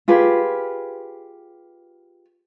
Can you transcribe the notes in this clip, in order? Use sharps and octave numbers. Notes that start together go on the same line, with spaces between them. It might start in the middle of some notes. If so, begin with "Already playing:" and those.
F4 G4 G#4 B4